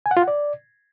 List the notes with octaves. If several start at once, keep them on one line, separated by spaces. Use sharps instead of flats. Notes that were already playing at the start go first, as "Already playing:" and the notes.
G#5
F#5
F4
F#5
D5